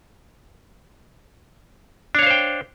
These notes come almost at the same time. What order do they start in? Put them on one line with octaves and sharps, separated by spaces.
D4 C#5 F5 C5 G5